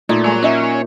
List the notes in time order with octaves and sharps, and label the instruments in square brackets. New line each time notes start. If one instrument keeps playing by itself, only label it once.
[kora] A#2 [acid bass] A3 [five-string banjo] D#4
[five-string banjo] G3 G#3 [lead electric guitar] C#5 A#5
[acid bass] C#4 [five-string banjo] D#4 D#5 E5